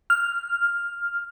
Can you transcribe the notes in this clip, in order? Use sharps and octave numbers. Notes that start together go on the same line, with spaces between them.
F6